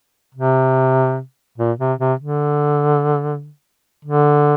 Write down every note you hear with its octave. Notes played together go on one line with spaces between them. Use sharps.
C3
A#2
C3
C3
D3
D3